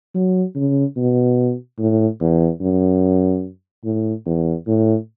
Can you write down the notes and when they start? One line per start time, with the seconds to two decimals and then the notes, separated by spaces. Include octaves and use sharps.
0.15 F#3
0.56 C#3
0.97 B2
1.79 A2
2.20 E2
2.61 F#2
3.85 A2
4.26 E2
4.67 A2